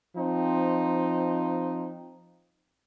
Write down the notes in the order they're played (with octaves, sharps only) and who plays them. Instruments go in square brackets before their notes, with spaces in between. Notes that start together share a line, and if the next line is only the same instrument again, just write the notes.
[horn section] F3 C4 D#4